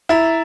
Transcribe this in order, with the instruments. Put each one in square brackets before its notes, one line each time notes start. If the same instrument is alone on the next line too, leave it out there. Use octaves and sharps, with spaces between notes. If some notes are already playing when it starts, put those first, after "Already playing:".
[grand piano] E4 [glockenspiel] A#5 E6 A6 E7